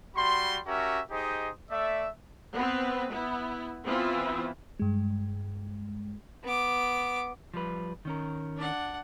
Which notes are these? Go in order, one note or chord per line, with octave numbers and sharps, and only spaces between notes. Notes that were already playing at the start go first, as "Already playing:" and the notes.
G3 F#4 B5 C6
C#4 F#4 G4 A#4 E5
D#4 G4 G#4 C5 D#5
A3 D5 E5
B3 C4 B4
B3 E4
E3 B3 C4 E4 F4
G2 G#3
B3 D6
F3 G3 B4
D#3 C#4 A#4
D4 F#5